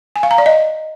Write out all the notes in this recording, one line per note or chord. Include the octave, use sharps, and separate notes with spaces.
G#5
F5
A#5
D5
D#5